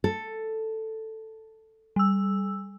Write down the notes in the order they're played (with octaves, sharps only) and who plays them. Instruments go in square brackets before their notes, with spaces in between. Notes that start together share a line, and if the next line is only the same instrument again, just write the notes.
[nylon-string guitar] A4
[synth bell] G3 E6